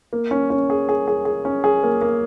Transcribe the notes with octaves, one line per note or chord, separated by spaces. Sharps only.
A#3
C#4
C#4
G#4
G#4
G#4
G#4
C#4
G#4
A#3
A#3